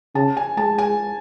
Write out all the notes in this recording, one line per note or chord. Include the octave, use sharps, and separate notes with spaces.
C#3 A5
G#5
G#3 A5
G#5